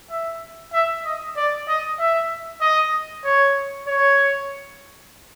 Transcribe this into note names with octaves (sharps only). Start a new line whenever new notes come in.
E5
E5
D#5
D5
D#5
E5
D#5
C#5
C#5